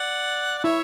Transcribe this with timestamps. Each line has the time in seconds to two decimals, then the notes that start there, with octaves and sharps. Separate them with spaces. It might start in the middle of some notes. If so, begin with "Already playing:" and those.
Already playing: D5 F#5
0.59 F#5
0.64 E4 C#5 E5